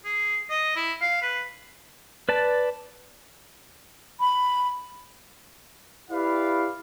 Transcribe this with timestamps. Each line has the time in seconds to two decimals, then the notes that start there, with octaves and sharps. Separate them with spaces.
0.05 G#4
0.50 D#5
0.76 E4
1.01 F5
1.22 B4
2.29 B4 D5 A5
4.20 B5
6.10 E4 G4 B4 D5 F5